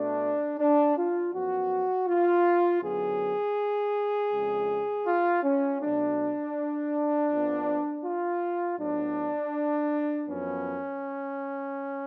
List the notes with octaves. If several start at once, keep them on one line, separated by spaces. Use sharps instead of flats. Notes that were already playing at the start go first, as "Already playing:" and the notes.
Already playing: B2 A3 D4
D4
F4
F#2 F3 B3 F#4
F4
F#2 D3 F#3 B3 G#4
F2 C#3 G#3
F4
C#4
B2 F#3 A3 D4
F2 F3 B3
F4
A2 F#3 B3 D4
F#2 F3 B3 C#4